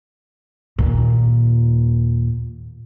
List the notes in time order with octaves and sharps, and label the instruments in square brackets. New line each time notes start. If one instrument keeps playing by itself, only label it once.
[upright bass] D#2 A#2